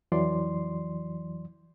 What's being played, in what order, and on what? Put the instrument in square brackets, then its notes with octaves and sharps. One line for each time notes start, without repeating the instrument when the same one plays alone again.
[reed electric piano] F2 E3 F#3 D5 C6